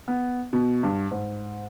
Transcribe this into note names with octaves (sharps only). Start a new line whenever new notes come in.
B3
B2
G2
G#2